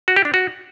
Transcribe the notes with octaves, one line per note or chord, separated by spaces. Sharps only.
F#4
G4
D4
F#4